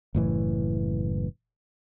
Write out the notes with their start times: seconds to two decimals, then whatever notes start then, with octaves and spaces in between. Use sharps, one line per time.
0.15 F#1 A2 E3